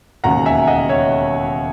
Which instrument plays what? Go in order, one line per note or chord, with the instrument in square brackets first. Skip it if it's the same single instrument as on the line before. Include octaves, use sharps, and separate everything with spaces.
[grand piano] E1 D#2 C#3 F#5 A#5
E5 G#5
D#5 F#5
C#5 E5